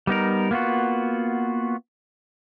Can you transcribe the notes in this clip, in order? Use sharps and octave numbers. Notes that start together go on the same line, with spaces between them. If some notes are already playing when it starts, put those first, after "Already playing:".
G3 B3 D#4 A#4
A#3 B3 F4 F#4